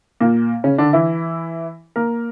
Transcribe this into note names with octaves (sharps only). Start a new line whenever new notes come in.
A#2 A#3
C#3 C#4
D3 D4
E3 E4
A#3 A#4